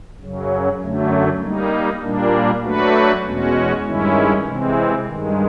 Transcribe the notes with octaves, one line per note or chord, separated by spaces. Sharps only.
F#2 C#3 F#3
F#2 D3 F#3 A3
G3 A#3 D#4
A#2 G3 A#3 D4
F#3 A3 D4 F#4 B4
E2 B2 G#3 C#4 F#4
G2 D#3 G#3 C#4 E4
C3 E3 G#3 C4
G2 D#3 G#3